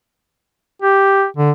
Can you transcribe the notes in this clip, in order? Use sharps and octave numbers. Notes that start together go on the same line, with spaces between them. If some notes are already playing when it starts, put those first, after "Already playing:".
G4
D3